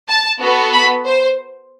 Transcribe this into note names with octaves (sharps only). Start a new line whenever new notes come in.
A5
B3 F#4 A4
B5
C5